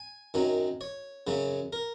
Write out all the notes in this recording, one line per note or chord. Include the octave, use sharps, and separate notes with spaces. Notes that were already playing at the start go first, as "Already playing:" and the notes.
Already playing: G#5
F#2 D#3 F#3 C#4
C#5
F#2 C#3 F#3 C#4
A#4